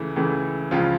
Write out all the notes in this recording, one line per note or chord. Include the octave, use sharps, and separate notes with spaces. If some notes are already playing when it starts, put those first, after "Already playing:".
Already playing: C#2 C#3 E3 A3 E4
C#2 C#3 E3 A3
C#2 C#3 F3 F4